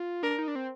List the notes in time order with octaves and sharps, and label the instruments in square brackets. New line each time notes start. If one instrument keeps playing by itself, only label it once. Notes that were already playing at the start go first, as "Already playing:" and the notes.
Already playing: [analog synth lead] F4
[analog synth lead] D4 [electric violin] A#4
[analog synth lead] D#4
D4
C4